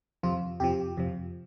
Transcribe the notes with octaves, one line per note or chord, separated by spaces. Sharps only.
F2 C3 F3 F4
F2 C3 F3 G4
F2 C3 F3